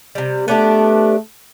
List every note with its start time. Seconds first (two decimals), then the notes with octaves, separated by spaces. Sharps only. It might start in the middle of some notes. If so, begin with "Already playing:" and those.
0.15 C3 G3
0.48 A3 B3 D4 G4